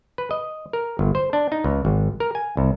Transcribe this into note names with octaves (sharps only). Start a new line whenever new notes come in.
B4
D#5
A#4
G1
C5
D4
D#4
C#2
G#1
A#4
G#5
C2